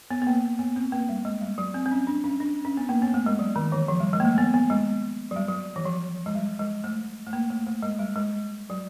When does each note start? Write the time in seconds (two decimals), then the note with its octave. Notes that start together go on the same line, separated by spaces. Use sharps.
0.11 B3
0.22 B3
0.27 A#3
0.59 B3
0.76 C4
0.92 A#3
1.09 G3
1.25 G#3
1.41 G3
1.58 F#3
1.74 C4
1.86 C4
1.91 C#4
2.07 D4
2.24 C#4
2.40 D4
2.65 C#4
2.77 B3
2.89 A#3
3.02 B3
3.14 A3
3.26 G#3
3.39 F#3
3.56 D#3
3.72 E3
3.88 F3
4.00 G3
4.13 G#3
4.20 A#3
4.25 A3
4.38 B3
4.54 B3
4.70 G#3
5.31 F#3
5.36 G3
5.48 F#3
5.76 E3
5.85 F3
6.26 G#3
6.35 G3
6.59 G#3
6.84 A3
7.27 A3
7.33 A#3
7.50 A3
7.67 A3
7.83 G#3
7.99 G3
8.16 G#3
8.70 F#3